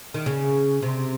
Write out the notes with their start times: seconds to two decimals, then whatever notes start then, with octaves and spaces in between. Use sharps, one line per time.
0.14 D#3
0.26 C#3
0.82 C3